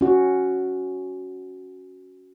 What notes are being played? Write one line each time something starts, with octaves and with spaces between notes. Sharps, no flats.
C#4 F#4